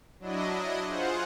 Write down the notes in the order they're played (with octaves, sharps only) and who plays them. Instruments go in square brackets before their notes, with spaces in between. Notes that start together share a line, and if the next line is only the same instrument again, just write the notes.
[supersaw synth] F#3 D4 E4 D#5
F4 G#4 C5 F#5